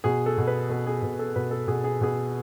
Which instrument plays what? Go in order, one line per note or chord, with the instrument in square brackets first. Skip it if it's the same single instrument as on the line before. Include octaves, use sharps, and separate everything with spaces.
[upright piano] B2 G#4
A4
B2
B4
B2 A4
G#4
B2
A4
B2 B4
A4
B2 G#4
G#4
B2 G#4